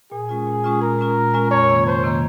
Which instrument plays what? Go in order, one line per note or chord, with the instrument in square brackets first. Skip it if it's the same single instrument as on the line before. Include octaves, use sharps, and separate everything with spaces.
[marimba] A#2 [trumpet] G#4
[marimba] G#3 C#4 F4
A#2
G#3 C#4 F4
[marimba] A#2 [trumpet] A#4
[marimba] G#3 C#4 F4
A#2
G#3 C#4 F4
[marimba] F2 [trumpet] C#5
[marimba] C3 D#3 A#3
[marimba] F2 [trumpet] C5
[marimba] C3 D#3 A#3